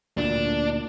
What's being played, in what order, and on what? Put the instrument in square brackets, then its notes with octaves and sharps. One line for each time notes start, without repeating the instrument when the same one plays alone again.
[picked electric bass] D2 A#2 [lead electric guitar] D4